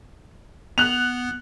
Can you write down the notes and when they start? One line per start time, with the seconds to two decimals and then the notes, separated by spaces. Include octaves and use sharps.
0.78 B3 F#6 F7